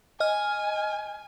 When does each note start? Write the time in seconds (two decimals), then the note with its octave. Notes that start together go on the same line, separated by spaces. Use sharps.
0.20 D#5 G#5 F6